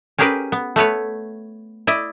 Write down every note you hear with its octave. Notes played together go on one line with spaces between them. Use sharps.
C#4 G4 G#4 A#4 B4 G5
B3
A3 B3 B4 C#5
E4 D5 D#5